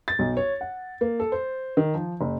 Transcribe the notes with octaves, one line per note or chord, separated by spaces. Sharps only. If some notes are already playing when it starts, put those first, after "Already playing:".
A6
B1
C#5
F#5
A#3
A4
C5
D#3
F3
F#1